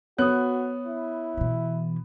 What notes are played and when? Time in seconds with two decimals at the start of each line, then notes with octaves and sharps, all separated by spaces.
0.18 B3 F#4 C#5 D#6 F#6
0.87 E4
1.38 B2 E3